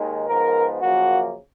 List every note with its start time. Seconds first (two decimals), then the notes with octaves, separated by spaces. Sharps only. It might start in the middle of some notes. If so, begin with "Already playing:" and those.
Already playing: D#2 D#3 G#3
0.27 G#2 F3 B3 A#4
0.81 F#2 C#3 F3 A#3 F#4